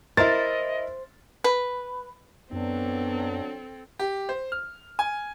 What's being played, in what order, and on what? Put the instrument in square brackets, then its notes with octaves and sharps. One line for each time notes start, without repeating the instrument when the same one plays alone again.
[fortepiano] E4 A#4 [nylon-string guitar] C5 [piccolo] D#5 [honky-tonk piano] A6
[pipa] B4
[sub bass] F#2 [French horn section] F#3 D4 [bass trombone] B3 [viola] C4 A4
[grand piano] G4
C5
F6
G#5